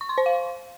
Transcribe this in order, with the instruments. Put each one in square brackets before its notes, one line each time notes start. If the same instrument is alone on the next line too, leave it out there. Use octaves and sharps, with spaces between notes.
[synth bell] C#6
C6
C5
F5